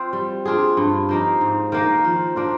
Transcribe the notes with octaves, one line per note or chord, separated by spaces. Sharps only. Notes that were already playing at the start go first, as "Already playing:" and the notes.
Already playing: C4 F4 C5
G3
D4 F4 G#4
G2
F3 A#3 D#4
G#2
D#3 A#3
F3
A#3 D4 F4